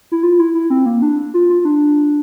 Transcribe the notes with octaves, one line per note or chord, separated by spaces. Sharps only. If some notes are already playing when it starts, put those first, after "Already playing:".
E4
F4
E4
E4
C4
A#3
D4
F4
F4
D4